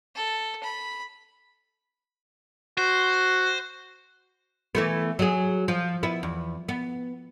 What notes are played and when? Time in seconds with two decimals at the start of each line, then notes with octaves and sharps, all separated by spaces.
0.15 A4
0.63 B5
2.78 F#4 C5
4.75 E3 A3 B3
5.19 F#3 G#4
5.68 F3
6.03 B3 E4
6.23 E2
6.68 B3